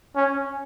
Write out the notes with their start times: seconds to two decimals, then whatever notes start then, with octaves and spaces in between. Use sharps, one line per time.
0.16 C#4